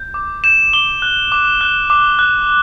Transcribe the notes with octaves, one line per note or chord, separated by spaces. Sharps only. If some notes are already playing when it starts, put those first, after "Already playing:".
Already playing: G6
D6
G6 E7
D6 G7
F#6
D6
F#6
D6
F#6